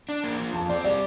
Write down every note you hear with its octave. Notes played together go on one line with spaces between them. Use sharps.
D4
A#3
F3
F2 A5
C4 D5
G3 D5